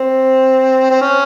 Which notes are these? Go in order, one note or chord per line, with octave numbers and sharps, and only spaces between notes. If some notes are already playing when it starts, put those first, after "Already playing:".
Already playing: C4
C4
C#4